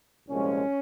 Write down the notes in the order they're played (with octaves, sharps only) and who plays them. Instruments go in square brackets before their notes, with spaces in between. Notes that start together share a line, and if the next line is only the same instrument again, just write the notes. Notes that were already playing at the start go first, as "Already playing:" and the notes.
[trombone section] C2 A#2 F3 G#3 C#4